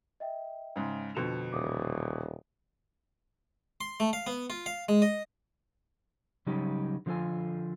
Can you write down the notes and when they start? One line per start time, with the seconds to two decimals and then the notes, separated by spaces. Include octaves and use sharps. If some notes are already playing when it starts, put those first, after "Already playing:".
0.20 D#5 E5 G5
0.76 G#2 C#3
1.15 F2 B2 D3 C#7 E7 F7
1.53 D#1 D6 D#6
3.81 C6
4.00 A3
4.13 F5
4.27 B3
4.50 F4
4.66 F5
4.89 G#3
5.02 D#5
6.46 C#3 F#3 G3 C#4 D#4 G4
7.06 D3 F3 D#4 F4 A4 G#5